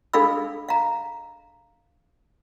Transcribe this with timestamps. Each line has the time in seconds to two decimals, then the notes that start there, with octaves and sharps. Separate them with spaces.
0.13 D4 G#4 A4 F5 B5 E6
0.69 F5 A#5